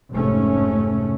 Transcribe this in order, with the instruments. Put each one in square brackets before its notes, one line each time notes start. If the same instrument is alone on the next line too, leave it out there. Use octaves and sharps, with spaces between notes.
[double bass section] F1 G#2 A3 C#4